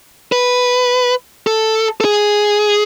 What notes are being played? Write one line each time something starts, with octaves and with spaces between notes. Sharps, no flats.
B4
A4
A4
G#4